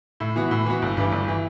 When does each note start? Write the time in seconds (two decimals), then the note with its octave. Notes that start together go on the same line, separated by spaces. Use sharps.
0.20 A2
0.36 E3 B3 F#4
0.51 A2
0.66 E3 B3 F#4
0.82 G1
0.97 G2 E3
1.12 G1
1.28 E3